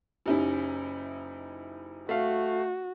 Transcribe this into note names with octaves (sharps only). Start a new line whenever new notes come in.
F#1 C#4 D#4 E4 G4
A3 F#4 F5